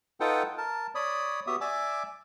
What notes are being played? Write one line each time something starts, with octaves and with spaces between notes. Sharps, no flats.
D#4 F4 A4 B4 F#5 G5
A#4 A5
C#5 D5 B5 D#6
B3 F#4 G4 E5 D#6
D5 E5 G#5 D6 E6